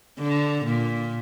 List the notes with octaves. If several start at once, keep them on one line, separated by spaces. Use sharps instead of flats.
D3
A#2